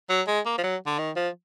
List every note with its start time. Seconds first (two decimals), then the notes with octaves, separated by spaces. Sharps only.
0.09 F#3
0.27 G#3
0.46 A#3
0.58 F3
0.64 F#3
0.87 D3
0.99 D#3
1.16 F3